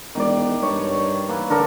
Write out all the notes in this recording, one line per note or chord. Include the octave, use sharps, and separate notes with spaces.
E1 D#3 D5
G2 C#5
E3 A#3
D3 A#3 A4 A#4